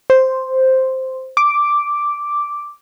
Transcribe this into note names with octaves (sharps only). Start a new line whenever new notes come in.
C5
D6